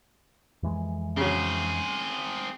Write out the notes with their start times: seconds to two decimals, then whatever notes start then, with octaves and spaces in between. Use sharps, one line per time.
0.63 F2 E3 G#3
1.17 C#3 F#3 C4 G#4